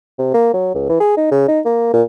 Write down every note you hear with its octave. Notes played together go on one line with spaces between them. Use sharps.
C3
A#3
F#3
C#2
E3
G#4
D#4
C#3
D#4
A#3
A#2